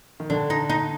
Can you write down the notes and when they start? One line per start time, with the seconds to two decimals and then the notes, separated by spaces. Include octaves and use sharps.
0.20 D#3
0.30 D3 D4
0.50 D#4
0.70 D#4